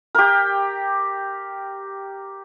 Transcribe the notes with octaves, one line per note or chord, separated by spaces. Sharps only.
G4 A#4